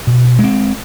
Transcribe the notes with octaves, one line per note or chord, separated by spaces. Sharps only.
B2
G#3 C4